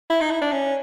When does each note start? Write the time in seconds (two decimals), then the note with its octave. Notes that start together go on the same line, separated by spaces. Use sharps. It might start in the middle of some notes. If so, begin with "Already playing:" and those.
0.10 E4
0.21 D#4
0.31 E4
0.42 D4
0.52 C#4